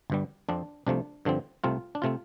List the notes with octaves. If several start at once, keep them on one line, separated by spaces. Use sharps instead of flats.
G1 G2 G3
F2 F3 C4 D4
C2 C3 F3 A3 D4
G2 D3 F3 C4
C2 C3 A3 C4 F4
D4
C3 A3 C4 F4